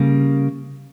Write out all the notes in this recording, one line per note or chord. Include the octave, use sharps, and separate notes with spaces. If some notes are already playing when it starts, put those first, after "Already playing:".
Already playing: C#3 G3 A#3